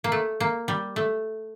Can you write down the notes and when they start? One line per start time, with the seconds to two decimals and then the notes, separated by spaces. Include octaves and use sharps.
0.04 A#3
0.12 A3
0.40 A#3
0.68 G3
0.96 A3